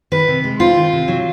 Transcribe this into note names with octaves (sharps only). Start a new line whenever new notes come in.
D#3 B4
C3
G#3
C4 F4
D#3
C3
F#3